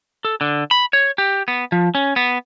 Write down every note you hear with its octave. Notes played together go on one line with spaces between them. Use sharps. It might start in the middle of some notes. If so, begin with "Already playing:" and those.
A4
D3
B5
C#5
G4
B3
F3
C#4
B3